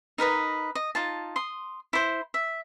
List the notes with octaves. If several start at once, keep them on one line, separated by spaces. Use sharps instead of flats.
D#4 A#4 B4 D#5
D#5
D#4 F4 A5
C6 D#6
E4 C5
E5